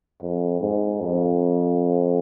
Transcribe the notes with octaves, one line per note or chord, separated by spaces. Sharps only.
F2
G#2
F2